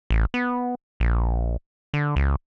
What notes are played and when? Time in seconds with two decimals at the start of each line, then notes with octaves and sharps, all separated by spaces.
0.10 A1
0.34 B3
1.00 A#1
1.94 D3
2.16 C#2